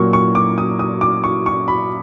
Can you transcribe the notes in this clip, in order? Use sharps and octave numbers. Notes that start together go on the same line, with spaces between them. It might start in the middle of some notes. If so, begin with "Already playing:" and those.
Already playing: A#2 F#3 A#3 C#6
C#6
D6
D#6
D#6
D6
C#6
C#6
B5